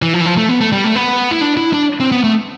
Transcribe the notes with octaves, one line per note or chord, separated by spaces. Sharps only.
E3
F3
E3
F3
A3
B3
A3
G3
A3
B3
E4
D4
E4
D4
C4
B3
A3